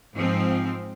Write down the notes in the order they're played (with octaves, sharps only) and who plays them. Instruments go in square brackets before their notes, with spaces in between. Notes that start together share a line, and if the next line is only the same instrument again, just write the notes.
[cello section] G#2 F3 C4